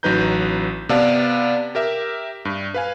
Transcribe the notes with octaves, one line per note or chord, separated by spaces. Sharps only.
A1 F#3 D#4 B4 A#5 G6
C3 B3 B4 D5 F5 A5
G4 A#4 E5
G2
B4 F5 G#5